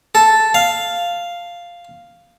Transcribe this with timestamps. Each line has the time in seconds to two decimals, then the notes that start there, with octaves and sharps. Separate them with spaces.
0.15 A4
0.54 F5